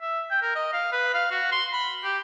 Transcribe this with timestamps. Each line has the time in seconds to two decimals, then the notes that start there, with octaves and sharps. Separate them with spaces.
0.01 E5
0.31 G5
0.42 A#4
0.56 D#5
0.73 F5
0.92 B4
1.14 F5
1.31 F#4
1.52 C6
1.73 B5
2.04 G4